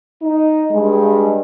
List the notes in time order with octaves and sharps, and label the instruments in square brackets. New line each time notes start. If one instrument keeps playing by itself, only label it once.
[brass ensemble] D#4
[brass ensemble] G2 [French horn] G#3